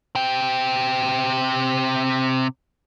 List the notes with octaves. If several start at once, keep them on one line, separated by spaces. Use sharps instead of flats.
C3 G5